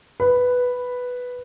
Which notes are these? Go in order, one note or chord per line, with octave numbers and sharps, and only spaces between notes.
B4